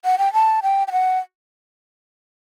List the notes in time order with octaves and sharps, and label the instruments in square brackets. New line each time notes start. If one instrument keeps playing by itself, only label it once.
[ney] F#5
G5
A5
G5
G5
F#5